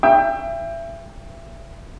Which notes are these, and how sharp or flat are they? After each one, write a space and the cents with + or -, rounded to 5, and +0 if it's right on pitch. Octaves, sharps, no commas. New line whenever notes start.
E5 +25 G5 +20